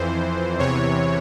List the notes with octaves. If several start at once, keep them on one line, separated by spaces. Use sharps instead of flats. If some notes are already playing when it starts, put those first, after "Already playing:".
Already playing: F2 E3 C5
E2 C3 E3 C#5